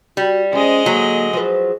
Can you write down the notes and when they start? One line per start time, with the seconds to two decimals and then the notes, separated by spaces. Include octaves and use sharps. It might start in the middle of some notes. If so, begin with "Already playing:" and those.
0.17 G3 F#4
0.53 F3 G#3 C#4 D#5
0.86 D3 F#3 A#3
1.33 F3 G#4 B4